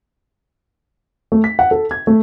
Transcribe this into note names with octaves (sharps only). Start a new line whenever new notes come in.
A3
B6
F#5
A4
G#6
A3